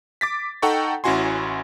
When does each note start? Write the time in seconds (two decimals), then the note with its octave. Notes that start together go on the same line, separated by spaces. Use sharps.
0.21 D6 A6 B6
0.62 D#4 A4 F#5 G5 A#5 C#6
1.04 A1 C#4 E4 F#4 G#5 C6